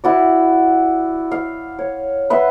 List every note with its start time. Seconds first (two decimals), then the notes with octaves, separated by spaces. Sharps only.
0.04 E4 F#4 D5
1.31 F5
1.79 C#5
2.30 B4 E5 F#5 C6